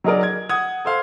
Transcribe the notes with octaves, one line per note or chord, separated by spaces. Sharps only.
F#3 D#4 G#4 A#4 D5
G#6
F#5 D#6 G#6
A4 C5 F5